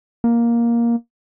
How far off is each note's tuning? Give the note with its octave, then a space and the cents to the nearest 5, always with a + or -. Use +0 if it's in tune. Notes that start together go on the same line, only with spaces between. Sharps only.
A#3 +10